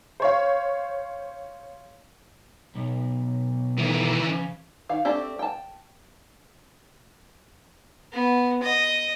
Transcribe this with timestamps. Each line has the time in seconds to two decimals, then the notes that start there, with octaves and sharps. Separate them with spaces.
0.20 C5 C#5 F5
2.75 B1
3.78 B2 D#3 E3 A3
4.25 C#3
4.89 D#3 F5
5.05 A3 C4 D4 G4
5.39 G5 A5
8.13 B3
8.63 D#5